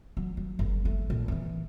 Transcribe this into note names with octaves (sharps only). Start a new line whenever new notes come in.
F#3
F#3
G1
A3
A#1
D#3 E3